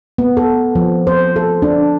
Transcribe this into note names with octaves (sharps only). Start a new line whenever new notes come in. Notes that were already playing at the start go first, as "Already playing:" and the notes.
B3
A4
F3
C5
A4
D4